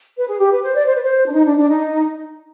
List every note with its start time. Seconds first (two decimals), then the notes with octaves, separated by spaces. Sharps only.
0.17 B4
0.27 G#4
0.39 G4
0.51 B4
0.63 C5
0.74 D5
0.86 C5
0.94 B4
1.02 C5
1.27 D4
1.34 D#4
1.46 D4
1.57 D4
1.70 D#4